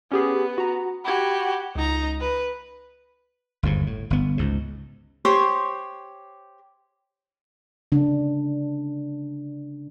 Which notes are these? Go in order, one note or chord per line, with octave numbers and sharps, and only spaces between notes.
B3 C#4 G4 G#4
F#4 A#5
F#4 G4 B5 G#6
C#2 D#4 A#5
B4
G1 D#2 G#2
A2
G1 B3
C#2 G#2
G4 C5 C#5 C6
C#3 D4